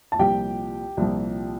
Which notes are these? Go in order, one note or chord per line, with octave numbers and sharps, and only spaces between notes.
A5
C2 A#2 F3 G4 G5
C2 A#2 F3